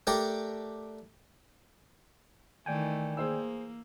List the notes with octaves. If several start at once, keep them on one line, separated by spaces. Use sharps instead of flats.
A3 D4 G4 A#4 D5 G5
D#3 E3 A3 D5 G5 G#5
A#3 G#4 C5 E6